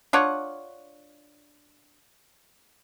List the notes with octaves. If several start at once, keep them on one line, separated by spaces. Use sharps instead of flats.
D4 F4 C#5 F#5